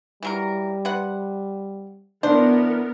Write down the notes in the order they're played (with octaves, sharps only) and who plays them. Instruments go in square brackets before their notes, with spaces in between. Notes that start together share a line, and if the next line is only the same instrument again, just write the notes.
[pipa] E3 F#3 A#4 [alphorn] G3
[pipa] C3 B4 F#5
[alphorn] E3 [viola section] B3 A#4 [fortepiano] D4 [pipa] C5